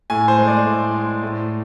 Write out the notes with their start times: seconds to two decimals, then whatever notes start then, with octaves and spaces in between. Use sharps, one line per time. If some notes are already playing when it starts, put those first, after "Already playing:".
0.10 A2 G#5
0.28 C5
0.38 G#3
0.48 D5
0.66 A2
0.94 G#3
1.23 A2